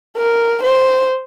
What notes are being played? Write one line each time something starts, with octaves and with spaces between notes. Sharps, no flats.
A#4
C5